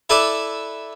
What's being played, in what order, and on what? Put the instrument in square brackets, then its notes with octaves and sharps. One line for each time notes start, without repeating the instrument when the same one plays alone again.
[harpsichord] E4 A4 B4 D5